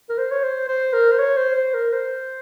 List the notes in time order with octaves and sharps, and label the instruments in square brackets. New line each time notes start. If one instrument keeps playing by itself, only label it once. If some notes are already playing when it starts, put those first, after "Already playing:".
[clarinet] A#4
C5
C#5
C5
C5
A#4
C5
C#5
C5
C5
A#4
C5